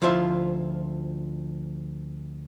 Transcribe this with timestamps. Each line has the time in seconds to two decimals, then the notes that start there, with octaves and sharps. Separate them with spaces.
0.02 D2 F3 E4 F4 C5 E5